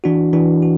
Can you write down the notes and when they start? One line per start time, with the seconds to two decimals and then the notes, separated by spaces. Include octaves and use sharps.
0.04 E3 D4 F#4
0.33 E3 D4 F#4
0.62 F#4